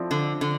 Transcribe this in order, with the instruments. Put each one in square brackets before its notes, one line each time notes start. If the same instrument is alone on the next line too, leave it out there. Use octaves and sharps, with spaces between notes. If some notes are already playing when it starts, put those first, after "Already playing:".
Already playing: [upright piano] F3 C4 E4 A4 D5
[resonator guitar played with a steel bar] D3
D3